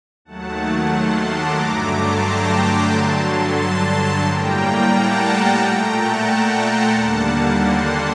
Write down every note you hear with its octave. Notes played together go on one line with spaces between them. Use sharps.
D#2 D#3 F#3 A3 F#5 A5
A5 C6
A#5 D6
G2 D3 F#3 A3
A5 C6
G5 A#5
G2 D3 F#3 A5 C6
A5 C6
A2 G3 A#3 G5 A#5
F#5 A5
A#2 A3 G5 A#5
F#5 A5
G5 A#5
A5 C6
D#2 D3 G3 A#3 F#5 A5
A5 C6